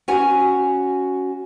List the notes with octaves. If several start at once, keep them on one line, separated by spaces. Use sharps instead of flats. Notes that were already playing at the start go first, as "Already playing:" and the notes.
C#4 F#4 G#5